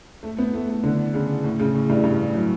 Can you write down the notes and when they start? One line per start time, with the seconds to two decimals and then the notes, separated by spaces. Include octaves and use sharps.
0.23 A3
0.39 B3
0.54 A3
0.69 A3
0.84 D3
1.14 C#3
1.44 A2
1.60 C#3
1.74 A2
1.90 G2
2.04 G2
2.20 A2
2.34 F#3